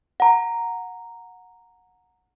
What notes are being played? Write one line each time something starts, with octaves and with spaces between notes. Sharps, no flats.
F#5 A#5